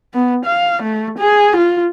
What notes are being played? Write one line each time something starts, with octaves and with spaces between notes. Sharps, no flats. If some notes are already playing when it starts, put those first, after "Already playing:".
B3
F5
A3
G#4
F4